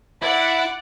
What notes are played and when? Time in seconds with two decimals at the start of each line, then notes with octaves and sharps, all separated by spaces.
0.22 E4 D5 F#5